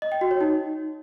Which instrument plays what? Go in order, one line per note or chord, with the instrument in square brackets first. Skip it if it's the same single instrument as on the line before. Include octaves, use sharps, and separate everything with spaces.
[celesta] D#5
G5
F#4
C#5
D#4